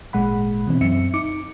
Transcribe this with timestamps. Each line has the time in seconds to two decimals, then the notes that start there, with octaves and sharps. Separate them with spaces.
0.13 G#1 A#2 G#3 F#5 B5
0.67 B2 E3 C4
0.81 F#2 C4 E5 C#7
1.14 D#4 D6 C#7